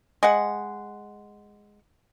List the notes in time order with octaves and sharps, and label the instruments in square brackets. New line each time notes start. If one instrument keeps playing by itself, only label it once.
[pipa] G#3 F#5